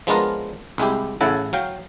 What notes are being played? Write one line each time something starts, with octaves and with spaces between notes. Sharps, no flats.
F3 G#3 B3 D4 F4 A#4
C2 G#3 E4 G4
A1 A2 C#3 E4 A4 F#5
F#3 F5 G5